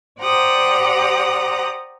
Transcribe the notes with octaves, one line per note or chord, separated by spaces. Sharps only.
G4 C5 D5 F#5 A#5 D#6